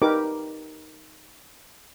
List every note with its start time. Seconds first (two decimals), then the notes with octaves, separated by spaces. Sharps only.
0.02 D#4 G4 A#4 B4 D6